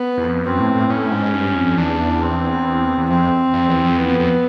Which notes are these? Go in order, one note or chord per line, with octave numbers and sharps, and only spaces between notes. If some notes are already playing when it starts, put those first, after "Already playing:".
Already playing: B3
E2
F2
F#2 C4
A2
A2
A2 C#4
G#2
G2
F2
E2 D4
C4
E2
F2 C4
F2
E2
F2
E2 B3
F2
F2